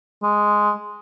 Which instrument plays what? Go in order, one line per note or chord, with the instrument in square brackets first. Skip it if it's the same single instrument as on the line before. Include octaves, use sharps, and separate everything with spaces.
[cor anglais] G#3